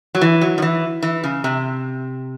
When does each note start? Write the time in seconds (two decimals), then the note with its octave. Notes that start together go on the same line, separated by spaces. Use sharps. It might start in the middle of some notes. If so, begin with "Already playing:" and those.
0.15 F#3
0.21 E3
0.41 F#3
0.58 D#3
0.62 E3
1.02 E3
1.24 C#3
1.44 C3